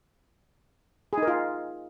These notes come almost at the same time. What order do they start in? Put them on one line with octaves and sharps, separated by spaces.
G#4 D#4 A#4 F4